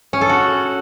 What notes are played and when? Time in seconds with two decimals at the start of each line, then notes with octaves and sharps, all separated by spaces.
0.13 C#4
0.21 A4
0.29 F#4